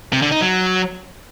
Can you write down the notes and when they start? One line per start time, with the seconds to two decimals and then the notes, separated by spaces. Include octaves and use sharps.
0.13 C3
0.22 D3
0.32 D#4
0.41 F#3